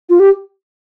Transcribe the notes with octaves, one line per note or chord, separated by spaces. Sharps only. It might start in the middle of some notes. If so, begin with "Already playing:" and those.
F4
G4